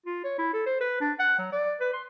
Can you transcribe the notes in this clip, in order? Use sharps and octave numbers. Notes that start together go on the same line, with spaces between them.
F4
C#5
E4
A4
C5
B4
D4
F#5
F#3
D5
B4
C6